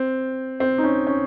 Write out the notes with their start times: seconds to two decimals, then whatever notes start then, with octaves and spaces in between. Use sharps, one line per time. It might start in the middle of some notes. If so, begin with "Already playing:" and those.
Already playing: C4
0.60 C4
0.78 D#4
0.84 C#4
1.07 C#4